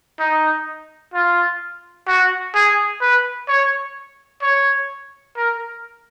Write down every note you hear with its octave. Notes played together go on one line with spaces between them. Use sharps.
D#4
F4
F#4
G#4
B4
C#5
C#5
A#4